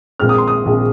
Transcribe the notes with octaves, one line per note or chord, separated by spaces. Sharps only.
A#1 A#2 G#3 C4 F6
D#6
C6
D#6
A#1 A#2 G#3 C4